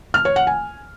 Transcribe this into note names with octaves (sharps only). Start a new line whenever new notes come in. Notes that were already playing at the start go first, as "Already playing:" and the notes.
F6
C#5
F#5
G#5